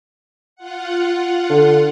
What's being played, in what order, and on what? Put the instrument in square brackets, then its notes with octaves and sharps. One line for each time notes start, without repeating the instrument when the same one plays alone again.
[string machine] F4 F#5
[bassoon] D3